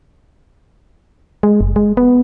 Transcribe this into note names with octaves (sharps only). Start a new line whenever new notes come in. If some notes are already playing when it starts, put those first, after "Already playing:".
G#3
F#1
G#3
B3